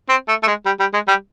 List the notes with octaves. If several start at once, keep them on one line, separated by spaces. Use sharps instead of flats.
C4
A3
A3
G#3
G3
G3
G#3
G3